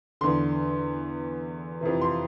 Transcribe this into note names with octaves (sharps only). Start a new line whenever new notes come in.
E2 D3 C6
F2 C3 E3
C6